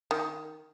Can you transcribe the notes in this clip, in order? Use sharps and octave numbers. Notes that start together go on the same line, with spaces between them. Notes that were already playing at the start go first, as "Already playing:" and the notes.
D#3